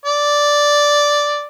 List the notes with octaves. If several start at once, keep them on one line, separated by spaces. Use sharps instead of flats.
D5